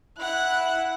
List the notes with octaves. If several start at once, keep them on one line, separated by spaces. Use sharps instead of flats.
E4 F#5 F#6